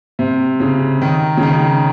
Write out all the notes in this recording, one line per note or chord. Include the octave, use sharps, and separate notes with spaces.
C3
C#3
D#3
C#3
D#3